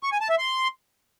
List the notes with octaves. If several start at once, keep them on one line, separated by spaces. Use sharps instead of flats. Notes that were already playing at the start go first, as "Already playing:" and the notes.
C#6
G#5
A5
E5
C6